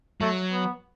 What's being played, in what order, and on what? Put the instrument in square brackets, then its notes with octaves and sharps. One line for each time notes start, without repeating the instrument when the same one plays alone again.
[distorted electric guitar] F#3 [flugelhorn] A3
[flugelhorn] B3